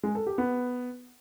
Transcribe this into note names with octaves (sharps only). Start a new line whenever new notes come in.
G#3
A4
G4
B3